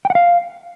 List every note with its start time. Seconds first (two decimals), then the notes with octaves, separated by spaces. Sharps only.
0.05 G5
0.10 F#5
0.15 F5